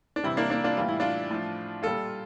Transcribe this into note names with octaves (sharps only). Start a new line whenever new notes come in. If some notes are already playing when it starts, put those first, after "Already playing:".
D4
C3 E3 G3 C4 E4
A#3 D4
A#3 D4
D4 F4
A2 E3 G3 F4
E4
D4 F4
A2 F3
A#2 G3 F4 A4